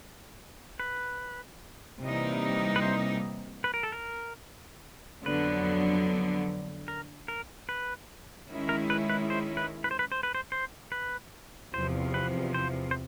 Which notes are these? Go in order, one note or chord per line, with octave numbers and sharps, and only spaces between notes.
B4
C3 E3 G3 A#3 D#4
B4
C5
B4
A#4
A4
A#4
F2 D3 F#3 B3 B4
A#4
A#4
B4
D#3 G#3 C#4 E4
A#4
B4
B4
C5
B4
B4
C5
B4
C5
B4
C5
C5
B4
E2 C3 F3 C5
B4
C5
C5